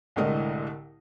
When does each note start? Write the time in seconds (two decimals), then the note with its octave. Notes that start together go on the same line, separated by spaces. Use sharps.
0.16 C2 A2 D3 G#3 A#4 D#5